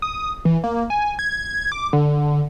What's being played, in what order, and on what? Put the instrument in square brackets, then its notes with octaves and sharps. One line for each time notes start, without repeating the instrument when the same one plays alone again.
[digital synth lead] D#6
E3
A#3
G#5
G#6
D6
D3